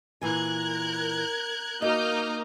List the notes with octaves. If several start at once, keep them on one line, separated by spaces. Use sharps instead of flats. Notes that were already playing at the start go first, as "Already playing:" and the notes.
A#2 E3 A#4 G#5 F#6 G#6
A#3 D#4 F#4 D#5 D#6 F6 G6